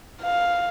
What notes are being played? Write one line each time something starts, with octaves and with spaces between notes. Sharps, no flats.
F5